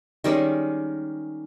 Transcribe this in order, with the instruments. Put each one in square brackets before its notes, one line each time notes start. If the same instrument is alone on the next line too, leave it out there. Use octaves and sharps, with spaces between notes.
[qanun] D#3 G3 G#3 C#4